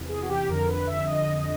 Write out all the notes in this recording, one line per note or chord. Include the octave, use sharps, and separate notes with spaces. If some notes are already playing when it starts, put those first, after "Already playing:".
Already playing: E2 C3 E3
G#4
F#4
G4
F2 D3 A#4
B4
E5
D#5